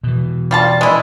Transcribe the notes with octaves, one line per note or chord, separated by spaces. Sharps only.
B2 E3
G3 F4 A5
G#3 E4